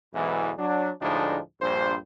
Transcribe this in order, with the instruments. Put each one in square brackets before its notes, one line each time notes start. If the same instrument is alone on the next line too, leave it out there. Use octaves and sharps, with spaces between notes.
[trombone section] B1 E2 G#2 E3
F#3 D4
D2 A2 F3 G#3 D4 D#4
A#1 G2 C5